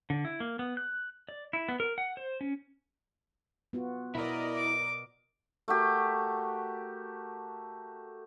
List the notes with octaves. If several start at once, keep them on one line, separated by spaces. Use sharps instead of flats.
D3
E4
A#3
B3
F#6
D5
E4
B3
A#4
F#5
C5
C#4
B3 F4 F#4
B2 E4 A#4 D5 D#5
D6
A3 F#4 G4 A#4